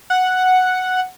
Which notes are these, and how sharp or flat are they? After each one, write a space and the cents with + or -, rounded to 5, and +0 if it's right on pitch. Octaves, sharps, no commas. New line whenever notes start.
F#5 +0